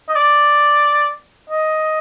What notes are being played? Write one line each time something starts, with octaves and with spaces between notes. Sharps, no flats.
D#5
D5
D#5